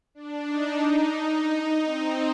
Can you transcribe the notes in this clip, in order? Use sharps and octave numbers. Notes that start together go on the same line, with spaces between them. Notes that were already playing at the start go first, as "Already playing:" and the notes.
D4
D#4
D#4
C4